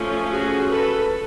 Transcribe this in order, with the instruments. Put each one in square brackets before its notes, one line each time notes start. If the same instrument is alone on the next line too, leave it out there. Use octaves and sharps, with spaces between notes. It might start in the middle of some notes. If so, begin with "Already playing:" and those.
Already playing: [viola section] F3 A3 C#4
F#4 G#4
A4 B4